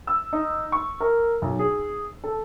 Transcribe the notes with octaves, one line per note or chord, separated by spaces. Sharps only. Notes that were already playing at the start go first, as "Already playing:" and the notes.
E6
D#4
C#6
A#4
B1
G#4
A4